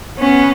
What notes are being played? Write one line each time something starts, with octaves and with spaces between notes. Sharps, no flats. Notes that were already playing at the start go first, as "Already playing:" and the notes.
B3 C#4